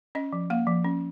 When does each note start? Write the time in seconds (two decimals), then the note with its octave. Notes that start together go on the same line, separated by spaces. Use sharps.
0.15 C#4 D#5
0.33 F3
0.50 A#3 F5
0.67 F3
0.84 C#4